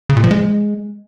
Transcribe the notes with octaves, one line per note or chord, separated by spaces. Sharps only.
C#3
A#2
F3
G#3